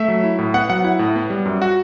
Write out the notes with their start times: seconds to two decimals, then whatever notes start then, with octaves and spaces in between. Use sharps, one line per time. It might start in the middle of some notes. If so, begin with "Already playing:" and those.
Already playing: A3 E5
0.08 F#3
0.24 E4
0.38 A2
0.54 B3 F#5
0.70 F#3 F#5
0.84 E4 F#5
0.99 A2
1.16 B3
1.30 G3
1.46 F#2
1.62 F#4